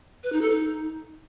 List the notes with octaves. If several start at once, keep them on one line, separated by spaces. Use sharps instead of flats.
B4
D#4
A4
D#4